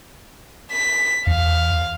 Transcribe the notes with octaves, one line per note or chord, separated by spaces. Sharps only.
B6
E2 F5